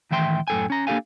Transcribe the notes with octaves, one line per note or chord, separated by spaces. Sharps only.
A2 D#3 E3 E5 G5 C6
F#2 A2 A4 G5 G#5
C#4 A#5
A#3 D4 G4 A4 F5 G#5